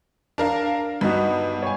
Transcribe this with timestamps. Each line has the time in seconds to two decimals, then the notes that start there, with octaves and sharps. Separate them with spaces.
0.38 D4 A#4 F5
1.01 G2 B3 D#4 F#4
1.63 C#5 G#5